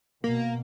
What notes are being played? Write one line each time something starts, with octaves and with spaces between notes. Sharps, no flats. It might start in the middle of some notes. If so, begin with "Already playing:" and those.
B2 A#3